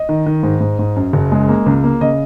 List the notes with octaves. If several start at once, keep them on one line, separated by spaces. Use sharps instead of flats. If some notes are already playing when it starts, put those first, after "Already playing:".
Already playing: D#5
D#3
D#3
G#2
G#2
G#2
F#2
F#1
G#3
A#3
C#2
A#3
C#3 D#5